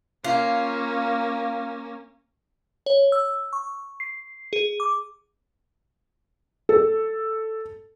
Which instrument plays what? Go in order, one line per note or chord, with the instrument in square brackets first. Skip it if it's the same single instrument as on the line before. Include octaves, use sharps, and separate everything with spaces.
[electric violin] A#3 C#4 [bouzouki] F4
[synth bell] C#5
E6
C#6
C7
G#4
D6
[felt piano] A4